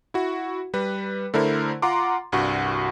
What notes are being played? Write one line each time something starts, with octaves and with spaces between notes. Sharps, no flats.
E4 F#4
G3 B4
D3 A3 E4 A#4 C5
F4 F#5 A#5 C6 D6
C2 G2 F#4